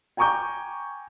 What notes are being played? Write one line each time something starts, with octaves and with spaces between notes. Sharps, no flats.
G5 G#5 A#5 C#6 D6 G6